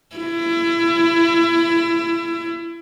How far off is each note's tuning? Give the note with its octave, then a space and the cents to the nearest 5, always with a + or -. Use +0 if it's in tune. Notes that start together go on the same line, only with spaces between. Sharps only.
E4 +30